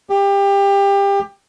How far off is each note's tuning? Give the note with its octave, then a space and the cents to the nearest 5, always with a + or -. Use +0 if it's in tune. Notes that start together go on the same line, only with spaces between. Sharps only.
G4 +25